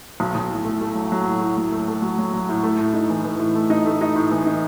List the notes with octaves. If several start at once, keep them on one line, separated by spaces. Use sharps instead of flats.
B1
B1
A2
A3
A3
F#3
F#3
A2
A2
F#3
A3
A3
F#3
F#3
F#3
A2
A3
A2
D#4
E3
E3
A2
A3
D#4
A3
D#4
A2
E3
D#4